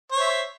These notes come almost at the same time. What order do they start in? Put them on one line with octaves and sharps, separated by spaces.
C#5 C5 E5